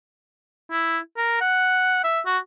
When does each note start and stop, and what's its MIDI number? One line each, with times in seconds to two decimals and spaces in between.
0.71 0.99 64
1.17 1.41 70
1.41 2.01 78
2.04 2.20 76
2.26 2.38 66